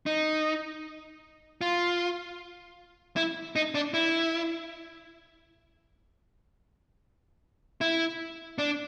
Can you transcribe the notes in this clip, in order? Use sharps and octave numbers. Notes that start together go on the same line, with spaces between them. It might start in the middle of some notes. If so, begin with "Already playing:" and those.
D#4
F4
E4
D#4
D4
E4
E4
D4